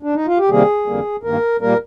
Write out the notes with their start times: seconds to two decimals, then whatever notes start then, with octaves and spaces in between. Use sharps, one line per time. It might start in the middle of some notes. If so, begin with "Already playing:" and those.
0.03 D4
0.15 D#4
0.26 F4
0.38 G4
0.49 C3 D#3 G3 A#3 G#4
0.87 F2 D3 G3 A#3
1.23 G2 D#3 A#3 A#4
1.61 A#2 G3 A#3 A#4